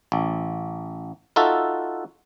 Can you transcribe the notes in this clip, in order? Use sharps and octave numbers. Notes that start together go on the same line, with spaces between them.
A1
D#4 F4 F#4 A4 E5